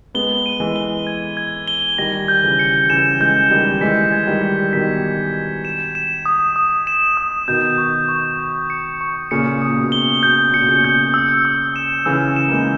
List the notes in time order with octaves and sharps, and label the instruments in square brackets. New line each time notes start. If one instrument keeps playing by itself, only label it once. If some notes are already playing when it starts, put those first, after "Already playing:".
[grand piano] G#3 B3 [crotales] G7
[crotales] D#7
[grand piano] E3 G#3
[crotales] G7
G#6
G#6
G7
[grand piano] D#3 G3 [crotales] A#6
[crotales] G6
[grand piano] C#3 E3
[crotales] C#7
[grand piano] C#3 E3 [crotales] E7
[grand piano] E3 G#3 [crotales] G6
[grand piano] D#3 G3 [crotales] G6
[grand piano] E3 G#3 [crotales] B6
[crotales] G#6
[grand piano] D#3 G3
[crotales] B6
[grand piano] B2 D#3 [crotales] B6
[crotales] G#6
G#6
E7
E7
D#6
D#6
E7
D#6
[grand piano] B2 D#3 [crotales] G6
[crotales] C#6
C#6
G6
C#7
C#6
[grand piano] A#2 C#3 [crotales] C#7
[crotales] D#6
[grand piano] A#2
B2
[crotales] G7
[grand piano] B2 [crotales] G6
[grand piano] A#2 [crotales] C#7
[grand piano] B2
A#2 C#3
[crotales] G6
E6
E6
E7
[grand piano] C#3 E3 [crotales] E6
[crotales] E7
[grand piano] A#3
E3 G#3